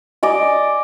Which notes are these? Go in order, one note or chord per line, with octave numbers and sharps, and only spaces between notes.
D5 D#5 G#5